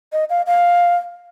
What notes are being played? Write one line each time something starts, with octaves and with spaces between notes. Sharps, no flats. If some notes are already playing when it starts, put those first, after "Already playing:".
D#5
F5
F5